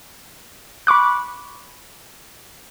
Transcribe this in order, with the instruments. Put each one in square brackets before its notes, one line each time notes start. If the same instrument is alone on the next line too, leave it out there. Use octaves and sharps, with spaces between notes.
[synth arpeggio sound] B5 C#6 D6 F#6